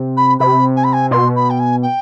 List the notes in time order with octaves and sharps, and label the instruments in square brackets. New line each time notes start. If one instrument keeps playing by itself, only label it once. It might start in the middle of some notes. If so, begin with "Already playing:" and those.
Already playing: [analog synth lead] C3
[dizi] B5
[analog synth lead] C3 [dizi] B5
[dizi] G#5
B5
G#5
[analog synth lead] B2 [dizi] C6
[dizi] B5
G5
G#5
G5